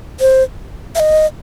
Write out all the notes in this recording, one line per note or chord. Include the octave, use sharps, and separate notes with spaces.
C5
E5
D#5